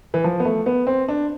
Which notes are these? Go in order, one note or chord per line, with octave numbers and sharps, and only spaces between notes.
E3
F3
B3
A3
B3
C4
D4